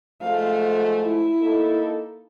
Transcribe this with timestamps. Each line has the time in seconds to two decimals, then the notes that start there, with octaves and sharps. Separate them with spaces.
0.21 G#2 F3 A3 F5
1.04 E4
1.40 A#3 D#4 A4